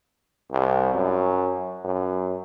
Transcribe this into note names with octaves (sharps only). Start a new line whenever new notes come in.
C2
F#2
F#2